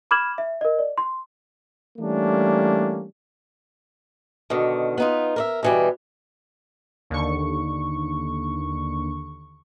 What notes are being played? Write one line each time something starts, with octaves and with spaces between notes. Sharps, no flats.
B5 D6 F6 G#6 E7 F#7
E5
A#4 D#5
D5
C6
E3 G3 A3 A#3 C#4 D4
B2 D3 D#3
B3 D#4 F4
A#4 D5 E5
B2 E3 G3
D#2 D3 C#6